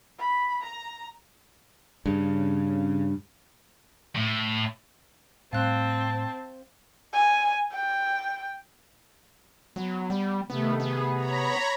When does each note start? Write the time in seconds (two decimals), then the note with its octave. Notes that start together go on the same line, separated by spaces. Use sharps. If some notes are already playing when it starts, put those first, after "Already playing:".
0.18 B5
0.63 A#5
2.06 G2 C#3
4.16 A2
5.53 A2 G3 C4 F5 A5 F#6
7.14 G#5
7.73 G5
9.76 F#3 B3
10.10 G3
10.50 C3 D#3 A3 B3
10.80 B3 G#4
11.14 C#5 A#5 B5